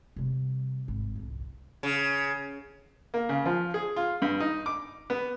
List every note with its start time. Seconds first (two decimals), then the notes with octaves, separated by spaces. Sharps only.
0.16 C3 G3
0.88 G#1
1.15 C2 F2
1.83 C#3
3.14 A#3
3.29 C#3
3.46 F3
3.74 G#4
3.96 F4
4.22 G2
4.40 D#4
4.66 D6
5.10 B3